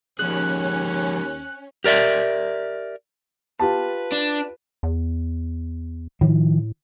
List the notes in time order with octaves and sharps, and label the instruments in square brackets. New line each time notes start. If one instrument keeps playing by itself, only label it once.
[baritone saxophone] D#2 [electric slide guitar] F3 G#3 G#4 [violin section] C#4 [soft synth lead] F#6
[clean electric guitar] G4 A#4 D5 E5
[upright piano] F4 G4 A5 [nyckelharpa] B4
[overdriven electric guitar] D4
[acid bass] E2
[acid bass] A2 [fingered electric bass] D#3 F3